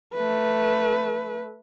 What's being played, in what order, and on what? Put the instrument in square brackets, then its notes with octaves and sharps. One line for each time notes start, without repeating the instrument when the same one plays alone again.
[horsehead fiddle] A3 B4